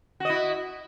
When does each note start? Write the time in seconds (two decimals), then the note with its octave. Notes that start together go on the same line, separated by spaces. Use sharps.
0.20 F#4
0.25 D#5
0.30 E4